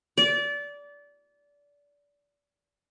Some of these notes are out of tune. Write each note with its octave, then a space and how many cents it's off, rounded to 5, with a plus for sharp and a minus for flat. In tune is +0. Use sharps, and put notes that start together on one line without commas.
D5 -25